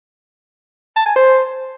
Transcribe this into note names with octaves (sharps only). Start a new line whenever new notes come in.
A5
G#5
C5